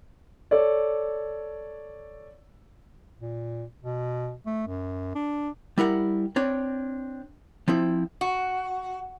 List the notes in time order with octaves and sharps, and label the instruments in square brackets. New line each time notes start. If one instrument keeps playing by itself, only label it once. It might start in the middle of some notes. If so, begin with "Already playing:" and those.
[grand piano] A4 C#5 D5
[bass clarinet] A#2
B2
A3
F#2
D4
[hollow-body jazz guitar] G3 E4 A#4 F#5
C4 D4 C#5
F3 C4 E4
[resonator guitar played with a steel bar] F#4